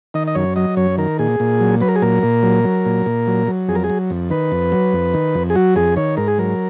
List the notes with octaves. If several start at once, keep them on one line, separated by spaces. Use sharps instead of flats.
D#3 D#5
D#5
F#2 C#5
F#3 D#5
F#2 C#5
D#3 A#4
A#2 G#4
A#2
F#3
F#3 B4
A#4
G#4
A#2 A#4
A#2
F#3
F#3
A#2
A#2
F#3
F#3
F2 G#4
A#4
G#4
F#3
F2
D#3 B4
F2
F#3
F2
D#3
F2
G#4
F#3 F#4
F2 G#4
D#3 C#5
G#2 A#4
G#4
F#3 A#4